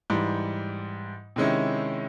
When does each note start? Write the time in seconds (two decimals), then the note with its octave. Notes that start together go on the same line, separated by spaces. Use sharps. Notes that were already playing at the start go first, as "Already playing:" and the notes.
0.10 G#2 E3 G3
1.36 C3 D#3 G#3 C#4 E4